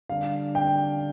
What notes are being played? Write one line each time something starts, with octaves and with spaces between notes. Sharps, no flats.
D3 G3 D4 F5
G5